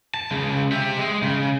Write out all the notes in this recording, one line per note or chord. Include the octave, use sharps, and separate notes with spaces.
A5
C#3 G#3
G4 E5
G#3
C#3